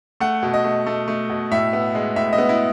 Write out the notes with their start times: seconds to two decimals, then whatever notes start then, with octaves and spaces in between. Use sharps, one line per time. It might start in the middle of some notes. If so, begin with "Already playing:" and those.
0.20 A3 F#5
0.43 B2
0.54 D#5
0.64 A3
0.86 A3
1.08 A3
1.29 B2
1.51 A2 E5
1.73 B3
1.95 G#3
2.16 A2 E5
2.33 D#5
2.38 B3
2.49 E4